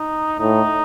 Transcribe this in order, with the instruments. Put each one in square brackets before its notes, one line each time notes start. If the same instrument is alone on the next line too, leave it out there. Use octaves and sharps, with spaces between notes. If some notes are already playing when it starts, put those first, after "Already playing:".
Already playing: [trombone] D#4
[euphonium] A2 [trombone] D#4